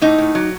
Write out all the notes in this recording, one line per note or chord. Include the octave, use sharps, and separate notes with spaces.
A2 D#4
A2
F#3